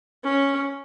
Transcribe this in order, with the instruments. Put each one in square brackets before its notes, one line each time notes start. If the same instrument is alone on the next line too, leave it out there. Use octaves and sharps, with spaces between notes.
[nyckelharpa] C#4